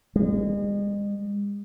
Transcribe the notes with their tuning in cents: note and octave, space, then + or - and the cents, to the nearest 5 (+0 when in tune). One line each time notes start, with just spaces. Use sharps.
G#3 -40